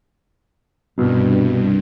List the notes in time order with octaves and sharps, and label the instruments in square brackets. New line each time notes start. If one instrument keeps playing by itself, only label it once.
[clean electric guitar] C2 [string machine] G2 [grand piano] B2